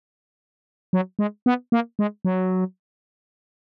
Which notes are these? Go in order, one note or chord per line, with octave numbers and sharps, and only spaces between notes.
F#3
G#3
B3
A#3
G#3
F#3